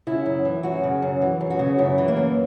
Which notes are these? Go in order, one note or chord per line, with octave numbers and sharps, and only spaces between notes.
C#3 E4
F#2
E3
F#2 F#4
C#3
F#2
E3
F#2
F#4
C#3
F#2 E4
E3
A#3
F#2